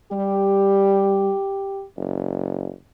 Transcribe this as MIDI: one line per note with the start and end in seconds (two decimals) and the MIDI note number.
0.12 1.33 55
0.12 1.85 67
1.97 2.71 30